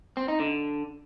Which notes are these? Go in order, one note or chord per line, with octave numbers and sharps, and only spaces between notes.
C4
D#4
D3